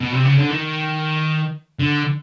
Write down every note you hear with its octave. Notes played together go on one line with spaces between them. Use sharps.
B2
C3
C#3
D3
D#3
D3